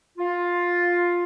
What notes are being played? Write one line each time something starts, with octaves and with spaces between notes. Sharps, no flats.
F4